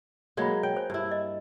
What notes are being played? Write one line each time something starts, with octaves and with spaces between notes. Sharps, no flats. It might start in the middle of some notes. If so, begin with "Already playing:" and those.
F#3 G#3 A#3 C#5 B5
C#5 G5
C5 G#5
G2 E4
D#5